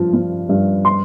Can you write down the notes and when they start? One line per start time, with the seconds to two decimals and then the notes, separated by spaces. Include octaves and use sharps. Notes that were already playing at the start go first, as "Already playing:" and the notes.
Already playing: G2 F3
0.14 F3
0.49 G2
0.85 C6